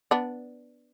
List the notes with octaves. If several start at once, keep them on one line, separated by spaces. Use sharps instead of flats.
B3 D4